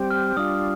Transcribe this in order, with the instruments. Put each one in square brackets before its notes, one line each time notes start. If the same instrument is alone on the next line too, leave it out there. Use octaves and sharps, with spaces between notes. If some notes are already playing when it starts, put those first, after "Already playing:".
Already playing: [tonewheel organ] G3 C4 G4
[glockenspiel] F6
[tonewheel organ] G3 D4 F4 [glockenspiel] D#6